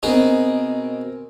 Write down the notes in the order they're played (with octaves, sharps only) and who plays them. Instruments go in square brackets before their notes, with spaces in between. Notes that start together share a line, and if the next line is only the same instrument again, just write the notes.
[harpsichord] B2 D#4 G#4 [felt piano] C4 A#4